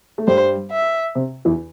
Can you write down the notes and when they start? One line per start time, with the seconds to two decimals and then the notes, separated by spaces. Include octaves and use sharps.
0.18 A3
0.27 G2 G3 C5
0.71 E5
1.15 C3
1.45 E2 E3